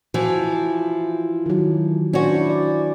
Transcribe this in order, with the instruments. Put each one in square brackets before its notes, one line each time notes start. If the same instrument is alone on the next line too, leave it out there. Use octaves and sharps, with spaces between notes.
[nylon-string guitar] E3 F3 [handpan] F#4
[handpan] D#3 F#3
[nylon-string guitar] C#4 F#4 [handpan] D4 C5
[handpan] E4 D5
D5